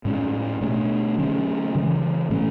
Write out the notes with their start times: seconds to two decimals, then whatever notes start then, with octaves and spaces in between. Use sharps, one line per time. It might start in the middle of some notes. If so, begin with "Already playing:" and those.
0.05 A2 G#3 C#4
0.61 B2 A3 D4
1.18 D3 F#3 A3 C#4
1.75 C#3 E3 G#3
2.30 A2 E3 A3 C#4